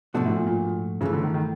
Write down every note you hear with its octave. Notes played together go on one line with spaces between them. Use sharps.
G#2 B2 F3 A3 D4 F#4
A2
A#2
A#2
G2 C#3 E3 A3
D3
D#3
D#3